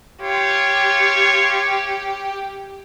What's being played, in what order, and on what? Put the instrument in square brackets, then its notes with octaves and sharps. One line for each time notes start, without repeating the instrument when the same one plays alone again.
[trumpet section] F4 C#5 [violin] G4